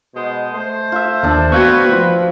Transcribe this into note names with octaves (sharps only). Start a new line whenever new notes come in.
B2 G#3 C5
A3 C5
F4 E5
D#2 F3 D4 A4
B3 C4 F#4 B4 F5 C#6 G6 G#6
F3 F4